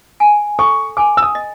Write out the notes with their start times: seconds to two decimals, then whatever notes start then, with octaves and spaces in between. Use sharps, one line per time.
0.20 G#5
0.59 A4 C#6
0.97 G#5 D6
1.17 E6
1.22 D#6
1.35 D#5